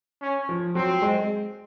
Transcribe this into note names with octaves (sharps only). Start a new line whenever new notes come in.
C#4
F3
F#3 C4
G#3